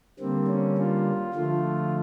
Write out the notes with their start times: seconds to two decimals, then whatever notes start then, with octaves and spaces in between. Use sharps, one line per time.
0.19 D3 G3 A#3 C4
0.48 C#4
0.77 F4
1.34 D3 F3 A3 F4